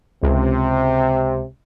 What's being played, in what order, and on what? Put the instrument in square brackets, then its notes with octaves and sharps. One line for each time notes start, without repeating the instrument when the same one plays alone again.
[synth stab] C#2 [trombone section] C3